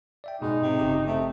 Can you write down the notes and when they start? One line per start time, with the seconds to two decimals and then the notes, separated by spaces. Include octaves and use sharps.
0.24 D5 E5 G5
0.42 G#2 B2 G#3 D#4
0.62 C3
0.79 G1 C#3 G4
1.07 C3 A3